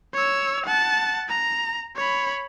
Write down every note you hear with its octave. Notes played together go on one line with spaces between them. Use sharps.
C#5 E6
F#5 A5
A#5
C#5 B5